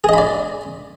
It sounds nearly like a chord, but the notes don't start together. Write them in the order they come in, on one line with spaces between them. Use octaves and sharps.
G#4 D#5 B5 D5